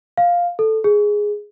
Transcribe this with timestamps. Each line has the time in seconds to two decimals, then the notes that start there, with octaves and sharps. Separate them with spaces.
0.18 F5
0.59 A4
0.84 G#4